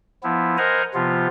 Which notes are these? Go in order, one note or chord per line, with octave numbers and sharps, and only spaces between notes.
F3 B3 E4
A#4 C5 D#5 F#5 G#5 A#5
C3 F3 B3 F4